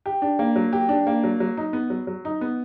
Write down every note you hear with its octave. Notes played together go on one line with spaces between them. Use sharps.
G4
D4
A#3
F#3
G4
D4
A#3
F#3
F#3
D#4
B3
F#3
F#3
D#4
B3